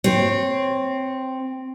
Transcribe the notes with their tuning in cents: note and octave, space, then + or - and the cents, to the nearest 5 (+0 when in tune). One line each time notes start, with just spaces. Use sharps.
C4 +0 C#5 -20